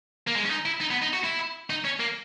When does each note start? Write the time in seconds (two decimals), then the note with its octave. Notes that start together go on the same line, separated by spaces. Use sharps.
0.27 A#3
0.36 G#3
0.45 C#4
0.50 D#4
0.65 E4
0.81 D#4
0.91 B3
1.02 D#4
1.13 F#4
1.24 E4
1.70 D#4
1.84 C#4
1.99 A#3